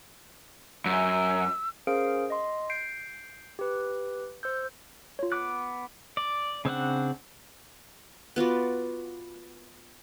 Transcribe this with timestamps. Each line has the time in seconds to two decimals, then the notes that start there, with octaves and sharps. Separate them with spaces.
0.86 F#2 E6
1.87 C#4 G#4 A#4 C5 F5 D7
2.30 D#5 C6
2.70 G6 C7 D7
3.59 G4 B4
4.43 C5 E6 G6
5.19 F4 C#5
5.32 B3 D6 F#6
6.17 D5
6.65 C#3 C4 D4 F#5
8.36 B3 F4 F#4 D5